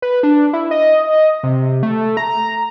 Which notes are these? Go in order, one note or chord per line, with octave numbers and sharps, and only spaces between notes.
B4
D4
E4
D#5
C3
A3
A#5